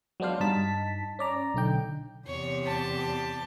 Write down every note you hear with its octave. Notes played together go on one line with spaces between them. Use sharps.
F#3 G#3 B3 D4 C5 F5
G2 D#4 A5 B6
C#4 D5 A#5
B1 D3 D#4 G5
E2 C3 C#5
G4 A5